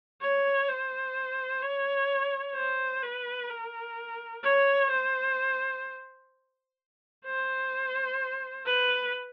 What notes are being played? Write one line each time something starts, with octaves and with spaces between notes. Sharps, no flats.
C#5
C5
C#5
C5
B4
A#4
C#5
C5
C5
B4